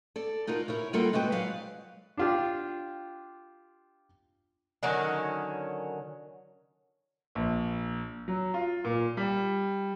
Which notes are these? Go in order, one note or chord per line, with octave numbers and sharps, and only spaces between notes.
A4 D5
D#4 F4 F#4 A4 A#4
E4 A#4 C#5
G3 A#3 F4 A4 A#4 F#5
G#3 A#3 F#4 B4 G5
F#3 G#3 B4 D5 F5 F#5
D4 F4 G4
D3 D#3 F#3 C#4
A#1
F#3
F4
A#2
G3